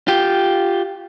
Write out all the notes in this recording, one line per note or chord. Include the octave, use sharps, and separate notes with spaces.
F4 G4